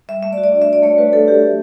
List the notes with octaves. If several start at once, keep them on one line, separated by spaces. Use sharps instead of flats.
G3 E5
A3 E5
D5
F#4
D5
D4
E5
A3 D5
A3 C#5
F#4 B4
D4 A4
A3 G4
F#3